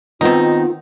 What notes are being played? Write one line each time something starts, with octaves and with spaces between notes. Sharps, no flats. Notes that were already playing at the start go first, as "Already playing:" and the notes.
B2 D#3 B3 C4 D#4 F4